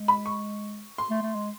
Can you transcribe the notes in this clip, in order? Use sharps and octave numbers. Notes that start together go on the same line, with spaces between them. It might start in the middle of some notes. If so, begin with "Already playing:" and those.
Already playing: G#3
B5
C#6
C6
A3
A3
G#3